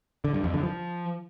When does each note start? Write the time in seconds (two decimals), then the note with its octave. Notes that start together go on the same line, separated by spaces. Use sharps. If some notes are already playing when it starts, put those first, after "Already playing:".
0.24 D3
0.34 G2
0.44 F2
0.54 D3
0.63 F3